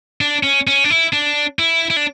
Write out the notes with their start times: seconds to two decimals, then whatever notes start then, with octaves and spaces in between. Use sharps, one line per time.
0.21 D4
0.43 C#4
0.67 C#4
0.84 D4
0.90 E4
1.13 D4
1.59 E4
1.90 E4
1.97 D4